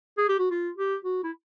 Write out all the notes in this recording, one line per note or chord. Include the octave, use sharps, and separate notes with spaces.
G#4
G4
F#4
F4
G4
F#4
E4